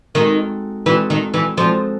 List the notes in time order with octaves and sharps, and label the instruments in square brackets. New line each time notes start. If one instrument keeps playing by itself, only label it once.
[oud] D#3 [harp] G#3 C4 D#4 F#4 A4
[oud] E3 [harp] G#3 C4 D#4 F#4 A4
[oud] D#3
E3
[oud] F3 [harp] G#3 C4 D#4 F#4 A4